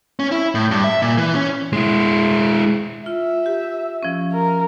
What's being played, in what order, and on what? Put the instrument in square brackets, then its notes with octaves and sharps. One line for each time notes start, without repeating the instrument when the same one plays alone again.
[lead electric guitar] C#4
E4
A2
G2
E5
A#2
E3
C#4
G#3 E4
[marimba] F4 [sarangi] E5
[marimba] G4
F3 C#4
[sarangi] A#4